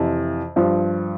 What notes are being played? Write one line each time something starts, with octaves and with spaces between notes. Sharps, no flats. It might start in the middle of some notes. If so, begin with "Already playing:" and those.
Already playing: F2 C3 E3
G2 F3